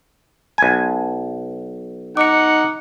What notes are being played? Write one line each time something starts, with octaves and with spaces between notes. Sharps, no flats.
B1 G#5
D#4 F#5 D6 C#7